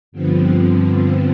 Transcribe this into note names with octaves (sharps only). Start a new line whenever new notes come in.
G2 D3 F3 B3 C4